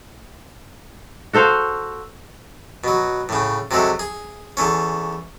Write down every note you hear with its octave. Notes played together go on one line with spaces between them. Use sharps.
F#4 A4 C5 F5
B2 F#3
A2 C#3
C3 F#3 G#3 A3
G#4
E2 A3 C#4